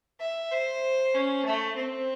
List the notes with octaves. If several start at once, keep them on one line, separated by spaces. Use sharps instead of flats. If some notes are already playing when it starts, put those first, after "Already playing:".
E5
C5
C#4
A3
C4